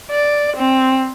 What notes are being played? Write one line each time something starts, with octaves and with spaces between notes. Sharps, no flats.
D5
C4